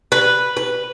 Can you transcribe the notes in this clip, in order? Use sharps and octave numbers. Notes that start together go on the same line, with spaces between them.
B4
B4